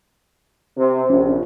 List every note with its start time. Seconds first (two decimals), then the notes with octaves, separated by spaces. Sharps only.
0.77 C3
1.10 A#1 C#4